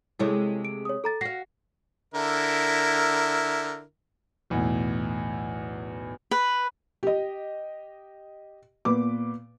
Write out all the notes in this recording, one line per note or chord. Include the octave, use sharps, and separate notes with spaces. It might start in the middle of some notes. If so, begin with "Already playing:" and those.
C3 G#3 A3 E4 C#5
D7
C#5 D#6
A4 A#5 A6
F#4 F5 A#6 C7
D3 E4 A#4
B1 E2 A2
B4
G4 D#5
A#2 B3 B4 D6